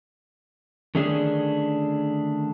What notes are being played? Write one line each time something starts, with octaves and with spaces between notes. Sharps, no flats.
D3 D#3 A3 C#4 D4 G#4